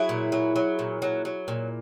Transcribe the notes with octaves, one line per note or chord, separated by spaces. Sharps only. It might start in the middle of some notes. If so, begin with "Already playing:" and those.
Already playing: F#3 E4 G#4
A#2
F#3
F#3
A#2
F#3
F#3
A#2